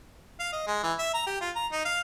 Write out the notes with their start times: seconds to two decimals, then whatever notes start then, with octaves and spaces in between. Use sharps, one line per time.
0.40 F5
0.53 D#5
0.67 G#3
0.83 E3
0.99 E5
1.14 A#5
1.27 G4
1.41 F4
1.56 A#5
1.72 D#4
1.85 F5